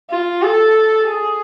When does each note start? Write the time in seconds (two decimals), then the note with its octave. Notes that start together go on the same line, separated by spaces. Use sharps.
0.10 F4
0.42 A4
1.07 G#4